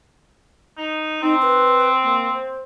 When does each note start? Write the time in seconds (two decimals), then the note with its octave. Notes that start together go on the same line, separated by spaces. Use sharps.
0.77 D#4
1.22 C4 D#4
1.42 B4
2.04 A#3
2.33 C5